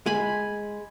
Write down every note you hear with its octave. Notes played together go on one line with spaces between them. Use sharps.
G#3 G#5 B5